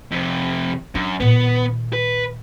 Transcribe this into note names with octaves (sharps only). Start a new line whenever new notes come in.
F2 C3
F#2 D4
A#2 D#3 B3
B4